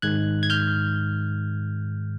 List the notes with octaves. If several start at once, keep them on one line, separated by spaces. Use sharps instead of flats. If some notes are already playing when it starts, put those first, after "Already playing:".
G#2 D#3 G#3 F#6 G#6
G#6
F6 G6